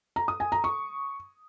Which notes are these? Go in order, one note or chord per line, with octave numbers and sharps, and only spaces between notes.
A#5
D#6
G#5
A#5
C#6